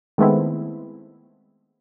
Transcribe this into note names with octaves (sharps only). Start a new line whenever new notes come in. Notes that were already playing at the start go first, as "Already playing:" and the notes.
D#3 G#3 A3 B3 C4 E4